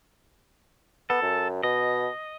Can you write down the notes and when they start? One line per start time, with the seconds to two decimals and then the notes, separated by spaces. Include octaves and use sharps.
1.10 B3 A4
1.23 F#2
1.63 B2 D#5